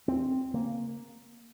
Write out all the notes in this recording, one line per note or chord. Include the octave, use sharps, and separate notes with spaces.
D#2 C4
C#3 A#3